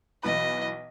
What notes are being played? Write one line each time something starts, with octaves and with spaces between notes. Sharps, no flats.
B1 E3 B4 D#5